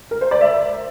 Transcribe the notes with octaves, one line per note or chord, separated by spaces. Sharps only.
A#4
C5
D5
E5